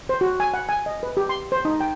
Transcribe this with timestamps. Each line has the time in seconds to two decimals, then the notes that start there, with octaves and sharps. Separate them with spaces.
0.09 C5
0.21 F#4
0.40 G#5
0.54 F#5
0.69 G#5
0.86 D#5
1.03 B4
1.17 G4
1.29 C6
1.52 C5
1.65 D#4
1.80 G5